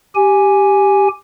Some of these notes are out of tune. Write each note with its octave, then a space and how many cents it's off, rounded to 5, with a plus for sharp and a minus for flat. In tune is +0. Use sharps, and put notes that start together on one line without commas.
G4 +0 G#5 +0